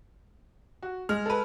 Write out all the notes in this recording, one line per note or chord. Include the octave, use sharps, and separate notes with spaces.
F#4
G#3 F6
A4 B4